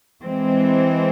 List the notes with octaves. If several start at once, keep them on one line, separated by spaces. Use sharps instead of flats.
E3 G#3 C4